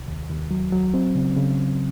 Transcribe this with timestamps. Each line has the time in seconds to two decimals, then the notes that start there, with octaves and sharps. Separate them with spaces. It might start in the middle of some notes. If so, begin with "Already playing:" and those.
Already playing: C2
0.08 D#2
0.30 D#2
0.51 F#3
0.72 F#3
0.94 C4
1.15 C#3
1.36 C#3